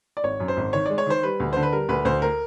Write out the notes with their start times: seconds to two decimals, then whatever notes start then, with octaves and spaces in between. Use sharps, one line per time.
0.17 D5
0.24 G#1 C#5
0.40 F#2
0.48 C5
0.57 G#1
0.73 D#3 C#5
0.86 G#3 D5
0.98 C#5
1.06 D#3 C5
1.23 G3 B4
1.40 D2
1.53 D3 C5
1.63 B4
1.73 G3 A#4
1.89 D2 B4
2.05 D2 C5
2.22 A#4